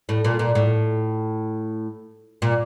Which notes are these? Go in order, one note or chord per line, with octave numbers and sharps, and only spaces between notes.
A2
A#2
A#2
A2
A#2